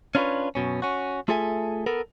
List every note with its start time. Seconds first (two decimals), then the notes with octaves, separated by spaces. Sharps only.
0.15 C#4 D4 F4 G#4 B4 C#5
0.55 F#2 B2 C#4
0.82 C#4 F#4
1.28 A3 F4 G#4 A4 E5 G#5
1.86 B3 A4 A#4